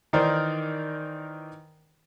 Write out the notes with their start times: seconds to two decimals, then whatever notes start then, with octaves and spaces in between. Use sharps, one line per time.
0.13 D#3 E3 D#4 A#4 C5 D5